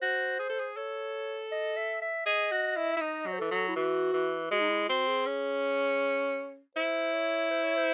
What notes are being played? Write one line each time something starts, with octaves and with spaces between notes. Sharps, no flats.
F#4 C5
G#4
A4
G#4
A4 C#5
D#5
E5
E5
G#4 D#5
F#4
E4
E5
E4
D#4 D#5
F#3
C5
E3 A4
F#3
E4
E3 F#4
E3
G#3 F#4
D#4
E4
C4 F#4
G#4
C#4
E4 C5
C#5
C5
C#5
C5